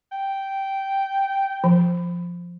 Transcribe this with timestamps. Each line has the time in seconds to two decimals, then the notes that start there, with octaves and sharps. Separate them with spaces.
0.12 G5
1.64 F3